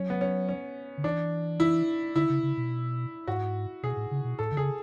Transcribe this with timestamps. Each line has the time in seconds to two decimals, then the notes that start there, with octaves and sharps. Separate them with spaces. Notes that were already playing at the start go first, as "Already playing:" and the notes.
Already playing: F#3 C#4
0.10 B3
0.21 C#4
0.49 C#4
0.98 D3
1.04 E3 D4
1.60 E4
2.16 D3 E4
2.30 C#3
2.43 C#3
2.57 B2
3.27 G#2 F#4
3.83 B2 G#4
3.97 A2
4.11 C#3
4.24 B2
4.39 A2 A4
4.52 D3
4.57 C#3 G#4